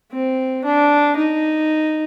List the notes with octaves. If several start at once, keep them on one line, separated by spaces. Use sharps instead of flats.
C4
D4
D#4